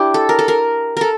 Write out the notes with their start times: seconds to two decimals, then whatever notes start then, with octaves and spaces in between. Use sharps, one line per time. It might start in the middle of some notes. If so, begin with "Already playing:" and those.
Already playing: D4 E4 G4
0.14 A4
0.29 A#4
0.39 A4
0.48 A#4
0.97 A4 A#4